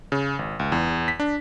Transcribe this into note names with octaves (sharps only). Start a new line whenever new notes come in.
C#3
G#1
C#2
E2
B6
D4